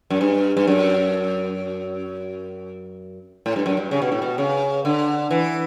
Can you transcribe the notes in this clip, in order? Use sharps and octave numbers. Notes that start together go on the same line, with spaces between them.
F#2
G2
G2
F#2
A2
G2
F#2
G2
C#3
B2
A2
B2
C#3
D3
E3